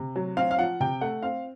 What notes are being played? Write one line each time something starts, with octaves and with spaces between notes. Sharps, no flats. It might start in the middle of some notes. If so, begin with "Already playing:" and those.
Already playing: C3
F#3
C4 F5
F5
F3 F#5
C3 G5
A3 F#5
C4 F5